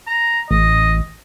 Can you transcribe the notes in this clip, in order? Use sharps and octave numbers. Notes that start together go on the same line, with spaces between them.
A#5
A1 D#5